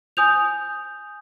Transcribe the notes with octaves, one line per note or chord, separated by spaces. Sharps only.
G#5 D#6 G6 F7